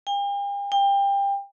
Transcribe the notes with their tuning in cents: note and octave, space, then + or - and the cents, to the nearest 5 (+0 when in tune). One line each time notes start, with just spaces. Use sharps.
G5 +45
G5 +25